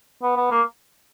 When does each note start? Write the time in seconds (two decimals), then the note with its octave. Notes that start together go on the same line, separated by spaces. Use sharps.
0.23 B3
0.36 B3
0.51 A#3